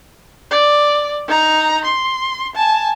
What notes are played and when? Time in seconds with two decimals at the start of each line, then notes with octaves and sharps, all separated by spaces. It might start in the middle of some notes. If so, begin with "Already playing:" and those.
0.51 D5
1.28 D#4 A#5
1.85 C6
2.56 G#5 A5